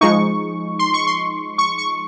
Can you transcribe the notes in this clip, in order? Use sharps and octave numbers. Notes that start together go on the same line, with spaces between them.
F3 G#3 D#4 C#6
C6
C#6
C6
C#6
C#6